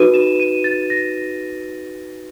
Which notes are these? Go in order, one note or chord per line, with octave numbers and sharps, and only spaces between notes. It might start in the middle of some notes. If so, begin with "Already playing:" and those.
Already playing: D#4 F#4 B4 D#7
E7
D#7
A6
A#6